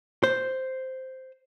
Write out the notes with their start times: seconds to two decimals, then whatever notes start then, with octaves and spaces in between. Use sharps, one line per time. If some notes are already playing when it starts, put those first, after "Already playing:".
0.24 C5